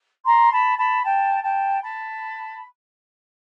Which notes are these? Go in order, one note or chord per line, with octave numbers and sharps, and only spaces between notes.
A#5 C6
A5 B5
A5 B5
G5 A5
G5 A5
A5 B5